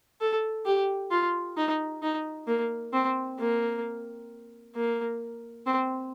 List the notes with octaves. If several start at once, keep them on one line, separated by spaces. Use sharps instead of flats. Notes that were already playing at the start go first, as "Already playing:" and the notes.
A4
G4
F4
D#4
D#4
A#3
C4
A#3
A#3
C4